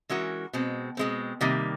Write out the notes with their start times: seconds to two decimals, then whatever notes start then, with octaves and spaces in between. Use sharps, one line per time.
0.09 E3 G#3 C#4 F#4 A#4
0.53 B2 G#3 C4
0.97 B2 G#3 C4
1.41 C3 D#3 G3 A#3